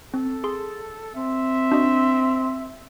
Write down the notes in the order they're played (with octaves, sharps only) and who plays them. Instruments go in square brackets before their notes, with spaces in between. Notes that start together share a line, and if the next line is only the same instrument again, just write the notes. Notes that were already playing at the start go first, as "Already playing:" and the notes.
[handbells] C4 [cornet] A4
[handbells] G#4 C6
[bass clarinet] C4 [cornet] E5
[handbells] D4 F#4 D#5